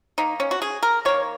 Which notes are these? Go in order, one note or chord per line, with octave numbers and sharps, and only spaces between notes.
D#3 A#3 D#4
C#4
F#4
G#4
A#4
D#3 A#3 C#5